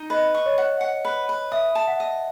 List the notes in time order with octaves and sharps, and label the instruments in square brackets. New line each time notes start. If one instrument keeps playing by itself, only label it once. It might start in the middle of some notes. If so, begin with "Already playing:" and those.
Already playing: [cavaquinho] D#4
[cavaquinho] B4 [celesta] D#5
[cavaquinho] C#6
[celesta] C#5
[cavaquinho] F#5
F#5
B4
B4
[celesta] E5 [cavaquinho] D#6
[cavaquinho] A5
[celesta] F#5
[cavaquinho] D#5